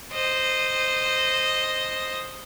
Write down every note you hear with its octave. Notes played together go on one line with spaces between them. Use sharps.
C5 D#5